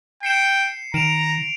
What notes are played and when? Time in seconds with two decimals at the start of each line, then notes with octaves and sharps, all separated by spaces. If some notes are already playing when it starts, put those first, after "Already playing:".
0.23 G5 C7 C#7 E7
0.94 D#3 A#5 D7 E7 F7